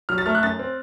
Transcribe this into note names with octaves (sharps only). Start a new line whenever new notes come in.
F#3 F6
A6
A3 F6
F#6
F#2 A6
C4